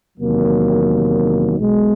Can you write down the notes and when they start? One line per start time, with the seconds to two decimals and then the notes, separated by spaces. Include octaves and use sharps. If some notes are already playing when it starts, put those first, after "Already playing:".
0.18 E2 C3 D#3 F#3 A#3
1.57 B1 B2 G#3